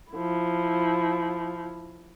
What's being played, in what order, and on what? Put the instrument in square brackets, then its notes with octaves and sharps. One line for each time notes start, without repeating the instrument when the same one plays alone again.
[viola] F3 E4